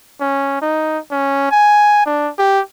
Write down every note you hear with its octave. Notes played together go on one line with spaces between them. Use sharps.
C#4
D#4
C#4
G#5
D4
G4